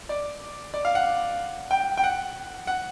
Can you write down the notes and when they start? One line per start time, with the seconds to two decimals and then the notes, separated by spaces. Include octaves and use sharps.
0.09 D5
0.74 D5
0.85 F5
0.95 F#5
1.71 G5
1.98 G5
2.04 F#5
2.67 F#5